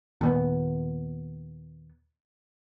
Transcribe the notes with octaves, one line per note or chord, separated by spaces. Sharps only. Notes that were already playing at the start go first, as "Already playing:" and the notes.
D#2 A#2 B3